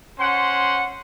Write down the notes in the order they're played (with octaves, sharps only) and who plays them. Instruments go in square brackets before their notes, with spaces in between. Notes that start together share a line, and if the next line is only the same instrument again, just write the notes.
[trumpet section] C#4 C5 F#5 C6